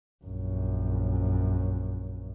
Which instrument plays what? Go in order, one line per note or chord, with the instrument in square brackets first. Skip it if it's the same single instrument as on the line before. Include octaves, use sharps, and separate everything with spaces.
[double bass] A#1 F#2